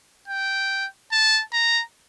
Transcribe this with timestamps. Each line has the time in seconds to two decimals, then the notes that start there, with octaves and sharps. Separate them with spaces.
0.28 G5
1.12 A5
1.53 A#5